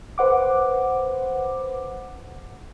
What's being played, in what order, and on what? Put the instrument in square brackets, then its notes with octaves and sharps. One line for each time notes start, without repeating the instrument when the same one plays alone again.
[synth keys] B4 C5 F#5 D6